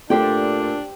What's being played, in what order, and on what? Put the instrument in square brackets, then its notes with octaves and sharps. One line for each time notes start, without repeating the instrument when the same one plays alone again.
[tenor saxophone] A#2 [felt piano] A3 [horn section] D4 [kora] G4 C5 G5